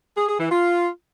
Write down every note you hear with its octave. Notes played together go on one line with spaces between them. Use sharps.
G#4
G#4
E3
F4